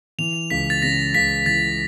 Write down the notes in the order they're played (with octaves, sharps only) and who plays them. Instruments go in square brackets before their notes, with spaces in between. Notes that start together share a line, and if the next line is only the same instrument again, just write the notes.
[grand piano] E3 [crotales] F7
[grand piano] C#2 [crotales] B6
[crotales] A6
[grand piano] C#3 [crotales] A#6
[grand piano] C#2 [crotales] B6
[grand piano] E3 [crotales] A6